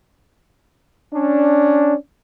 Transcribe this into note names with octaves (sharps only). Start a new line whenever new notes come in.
C#4 D4